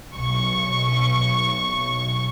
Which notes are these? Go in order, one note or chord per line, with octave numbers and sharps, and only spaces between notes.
B1 C#6